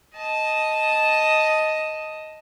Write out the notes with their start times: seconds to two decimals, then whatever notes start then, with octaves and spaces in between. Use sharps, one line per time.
0.16 D#5 A5